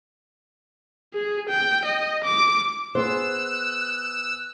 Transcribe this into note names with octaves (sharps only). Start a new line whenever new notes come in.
G#4
G5
D#5
D6
B3 G#4 C5 E6 F#6